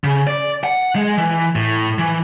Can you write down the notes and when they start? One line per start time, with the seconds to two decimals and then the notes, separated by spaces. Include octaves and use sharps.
0.04 C#3
0.27 D5
0.64 F#5
0.96 G#3
1.18 E3
1.55 A2
1.98 E3